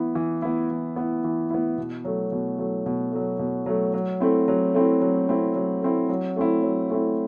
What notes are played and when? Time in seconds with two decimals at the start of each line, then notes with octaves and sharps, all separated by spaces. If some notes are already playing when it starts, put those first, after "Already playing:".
Already playing: E3 B3 E4
0.15 E3
0.42 B3 E4
0.70 E3
0.96 B3 E4
1.24 E3
1.50 B3 E4
1.77 B2
2.04 F#3 A3
2.32 B2
2.59 F#3 A3
2.86 B2
3.12 F#3 A3
3.39 B2
3.66 F#3 A3
3.94 F#3
4.20 A3 C4 E4
4.48 F#3
4.75 A3 C4 E4
5.01 F#3
5.29 A3 C4 E4
5.56 F#3
5.82 A3 C4 E4
6.09 F#3
6.36 A3 C4 E4
6.63 F#3
6.90 A3 C4 E4